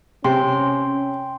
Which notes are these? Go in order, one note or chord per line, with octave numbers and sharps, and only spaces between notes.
C3 C#4 G5 C6